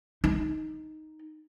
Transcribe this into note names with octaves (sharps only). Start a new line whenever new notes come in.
D#4